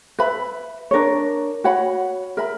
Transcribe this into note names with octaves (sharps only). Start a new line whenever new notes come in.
B4 E5 B5
D4 A#4 C#5
F#4 C#5 F#5 B5
A#4 E5 B5